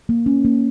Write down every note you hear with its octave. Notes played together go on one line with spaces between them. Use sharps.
A#3
C#4
A#3